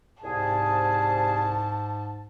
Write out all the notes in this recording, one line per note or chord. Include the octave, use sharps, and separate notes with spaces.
C2 G#2 G#4 A5